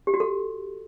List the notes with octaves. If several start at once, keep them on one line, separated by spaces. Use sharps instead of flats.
G4
F#4
A4